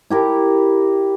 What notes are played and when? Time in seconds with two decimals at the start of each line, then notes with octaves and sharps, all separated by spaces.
0.10 E4 G4 A#4